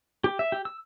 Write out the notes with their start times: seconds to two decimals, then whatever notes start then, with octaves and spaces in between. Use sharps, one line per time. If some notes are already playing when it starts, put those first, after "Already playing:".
0.24 G4
0.39 E5
0.52 G4
0.65 E6